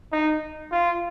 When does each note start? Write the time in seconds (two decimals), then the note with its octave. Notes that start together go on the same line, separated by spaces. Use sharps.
0.13 D#4
0.72 F4